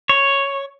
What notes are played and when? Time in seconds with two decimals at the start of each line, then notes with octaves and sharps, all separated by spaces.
0.09 C#5